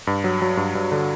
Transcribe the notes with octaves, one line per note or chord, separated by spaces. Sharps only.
G2
F#3
F#3
G2
G2
D3